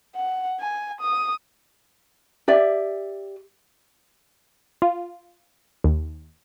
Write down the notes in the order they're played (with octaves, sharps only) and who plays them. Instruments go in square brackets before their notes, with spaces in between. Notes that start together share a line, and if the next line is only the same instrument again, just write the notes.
[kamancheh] F#5
G#5
D#6
[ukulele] G4 D5 E5
[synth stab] F4
D#2